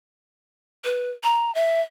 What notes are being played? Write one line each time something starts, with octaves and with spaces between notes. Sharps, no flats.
B4
A#5
E5